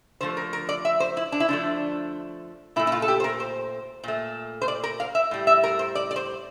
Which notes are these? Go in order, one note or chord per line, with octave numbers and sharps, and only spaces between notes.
D3 F3 A3 C5
A#4
A#4
D5
E5
C5
E4
D4
E4
D3 F3 A3 D4
A#2 A3 E4
E4
F4
A4
G4
C5
A#4
C5
A#2 A3
C5
D5
A#4
F5
E5
A2 G3
E5
A#4
C5
D5
D5
C5